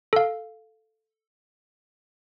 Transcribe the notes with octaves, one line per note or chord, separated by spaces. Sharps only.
A4 F5